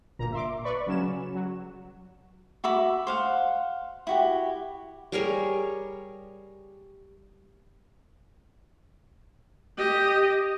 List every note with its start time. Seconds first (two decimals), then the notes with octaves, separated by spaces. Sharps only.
0.19 G1 A#2 A#5
0.32 E5 C6 D6
0.64 B4 D5 B5 C#6
0.87 C#3 F#3 C#4 E7
1.35 F#3
2.64 F#4 E5 B5 D6
3.07 C5 F5 F#5
4.07 E4 F#4 G4
5.12 G3 G#4 A#4 C#5
9.77 G4 D#5